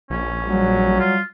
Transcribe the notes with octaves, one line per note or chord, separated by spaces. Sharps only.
A#1 C#4
F#3 G3
F4